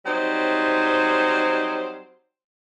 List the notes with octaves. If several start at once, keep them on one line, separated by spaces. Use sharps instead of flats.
F#3 G3 C4 D#4 C5